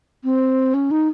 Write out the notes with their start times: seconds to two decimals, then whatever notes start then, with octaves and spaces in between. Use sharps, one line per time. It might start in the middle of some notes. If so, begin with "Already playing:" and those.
0.24 C4
0.74 C#4
0.91 D#4